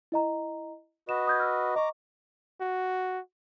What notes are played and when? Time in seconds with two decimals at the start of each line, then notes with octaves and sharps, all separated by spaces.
0.12 E4 D#5 A#5
1.09 F#4 B4 D#5 E7
1.27 D#6 G6 G#6
1.40 E6 F6
1.76 D#5 A#5 C#6 D6
2.61 F#4